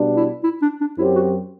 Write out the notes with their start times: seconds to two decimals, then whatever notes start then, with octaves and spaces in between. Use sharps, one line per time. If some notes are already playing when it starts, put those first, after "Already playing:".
Already playing: B2 G3 D4
0.16 E4
0.44 E4
0.62 D4
0.81 D4
0.98 F#2 F#3 C4 E4 G4
1.16 F#4